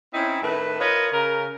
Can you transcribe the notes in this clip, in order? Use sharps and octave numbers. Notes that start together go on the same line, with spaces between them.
C4 C#4 D#4 E4
A2 D#3 A3 B4
F4 A#4 B4 C#5 D#5
C#3 A#4